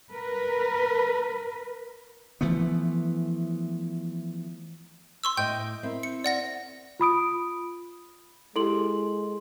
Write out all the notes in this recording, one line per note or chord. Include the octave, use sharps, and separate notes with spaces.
A#4 B4
E3 F3 A3 B3
C6 C#6 E6
A2 D#5 G5 G6
C4 E4 A#4
C#7
D5 F#5 A#6
F4 B5 D#6 D7
G#3 E4 G4 A4 C6 F#7